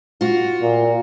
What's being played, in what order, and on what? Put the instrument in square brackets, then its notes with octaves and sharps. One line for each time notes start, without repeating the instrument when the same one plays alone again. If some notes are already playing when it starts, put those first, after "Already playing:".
[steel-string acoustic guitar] F4 F#4
[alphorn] A#2